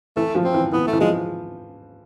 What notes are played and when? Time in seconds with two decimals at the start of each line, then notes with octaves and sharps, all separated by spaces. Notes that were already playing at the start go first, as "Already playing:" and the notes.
0.16 E3 A3
0.35 F3
0.45 C4
0.54 E3
0.72 E3 B3
0.87 A3
0.93 E3
1.01 F3 G#3